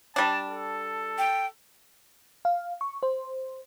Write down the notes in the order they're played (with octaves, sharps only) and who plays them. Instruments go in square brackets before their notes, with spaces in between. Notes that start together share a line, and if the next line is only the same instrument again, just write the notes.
[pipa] G3 D4 [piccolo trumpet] A5
[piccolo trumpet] A4
[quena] G5
[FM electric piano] F5
C#6
C5